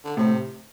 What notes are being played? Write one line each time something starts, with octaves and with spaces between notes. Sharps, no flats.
D3
A2 C3